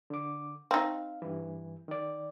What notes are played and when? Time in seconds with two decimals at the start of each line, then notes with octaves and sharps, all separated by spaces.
0.10 D3 D6
0.71 C4 D#4 F5
1.22 G2 E3
1.88 D#3 D5